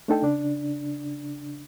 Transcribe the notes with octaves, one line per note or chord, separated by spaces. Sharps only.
A3 D4 D#4 A4 G5
C#3 D4